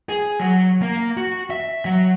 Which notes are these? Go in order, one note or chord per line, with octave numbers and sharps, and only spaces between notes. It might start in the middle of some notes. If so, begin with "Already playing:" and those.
G#4
F#3
A#3
F#4
E5
F#3